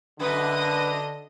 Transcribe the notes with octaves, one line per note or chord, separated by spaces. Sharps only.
F#2 D3 B4 D#5 D#6